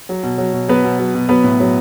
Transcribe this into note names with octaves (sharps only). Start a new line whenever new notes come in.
F#3
B2
F#3
B2
F#3 B3 B4
B2
F#3
B2
F#3 B3 B4
A2
F#3